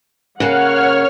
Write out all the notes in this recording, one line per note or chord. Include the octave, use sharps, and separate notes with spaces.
C#3 A#3 C#5 F#5 F6